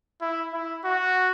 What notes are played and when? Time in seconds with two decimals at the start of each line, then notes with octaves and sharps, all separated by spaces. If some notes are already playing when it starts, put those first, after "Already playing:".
0.22 E4
0.54 E4
0.85 F#4